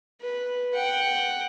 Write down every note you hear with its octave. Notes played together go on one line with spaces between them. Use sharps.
B4
F#5 G5